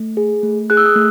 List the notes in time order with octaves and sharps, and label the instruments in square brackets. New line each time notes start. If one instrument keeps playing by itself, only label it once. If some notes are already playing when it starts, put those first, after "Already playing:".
Already playing: [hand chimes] A3
G#4
A3
G#4 F#6
E6
D#6 F#6
A3